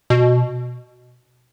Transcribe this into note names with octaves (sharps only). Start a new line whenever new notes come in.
B2